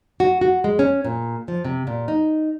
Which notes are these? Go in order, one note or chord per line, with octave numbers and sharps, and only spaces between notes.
F#4
F#4
G#3
C#4
A#2
F3
C3
A#2
D#4